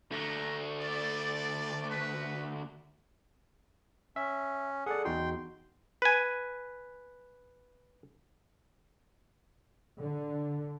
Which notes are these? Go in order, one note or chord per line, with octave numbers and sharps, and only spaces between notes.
D2 A3 D4 A#5
D5
F#4 B4
C#4 E5
G#4 A4 D5 F#5
E2 D#4 F#4 G5 C6
B4 G#5
D3